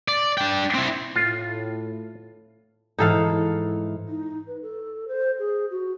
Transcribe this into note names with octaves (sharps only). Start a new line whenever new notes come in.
D5
D4 G5
C4 E4
A2 F4
G#2 E3 D#4 A4 F5
D#4
B4
A4
C5
G#4
F#4